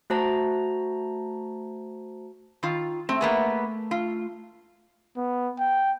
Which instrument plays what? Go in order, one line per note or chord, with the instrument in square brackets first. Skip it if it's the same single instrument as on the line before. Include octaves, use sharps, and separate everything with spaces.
[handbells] A3 F#4 C5 A5 A#5
[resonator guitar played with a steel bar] D#3 F4
[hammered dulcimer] A3 [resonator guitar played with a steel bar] C4
[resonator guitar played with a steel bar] A#3 B3 G#4
F4
[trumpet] B3
G5